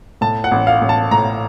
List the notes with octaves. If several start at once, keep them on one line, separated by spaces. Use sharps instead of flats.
A2 A5
F#5
A1
F5
A1
A5
A2 A#5